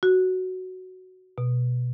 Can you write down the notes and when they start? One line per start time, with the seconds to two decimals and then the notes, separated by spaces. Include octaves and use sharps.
0.03 F#4
1.38 B2